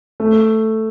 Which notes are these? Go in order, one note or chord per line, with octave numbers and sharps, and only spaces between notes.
A3